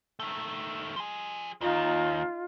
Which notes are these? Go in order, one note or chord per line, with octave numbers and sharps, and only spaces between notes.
D#3 A3
F3 G#4
D#2 D#4 F4